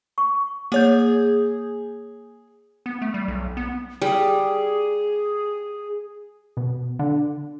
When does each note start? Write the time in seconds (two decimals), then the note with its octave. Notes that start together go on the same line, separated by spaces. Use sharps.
0.18 C#6
0.72 A#3 G#4 C#5 G6
2.86 B3
3.02 A3
3.14 G3
3.28 B1
3.57 B3
4.02 G3 G#4
6.57 B2
6.99 D3